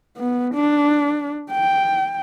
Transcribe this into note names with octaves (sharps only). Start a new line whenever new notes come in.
B3
D4
G5